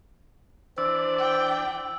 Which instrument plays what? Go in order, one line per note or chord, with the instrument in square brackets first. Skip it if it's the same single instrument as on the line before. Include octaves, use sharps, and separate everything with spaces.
[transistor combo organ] E3 D4 D5 [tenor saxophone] C5 [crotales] E6
[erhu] G5